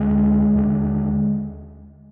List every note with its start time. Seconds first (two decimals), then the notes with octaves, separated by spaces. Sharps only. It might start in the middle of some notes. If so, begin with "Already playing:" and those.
Already playing: D2 D3 G#3
0.55 D#2 D3